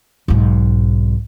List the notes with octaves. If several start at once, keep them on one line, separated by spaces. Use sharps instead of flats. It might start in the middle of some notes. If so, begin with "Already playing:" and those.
B1 G#2